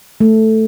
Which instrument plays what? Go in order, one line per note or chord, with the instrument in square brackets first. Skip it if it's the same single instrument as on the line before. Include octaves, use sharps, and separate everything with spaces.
[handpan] A3